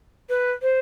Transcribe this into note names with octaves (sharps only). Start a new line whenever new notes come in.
B4
C5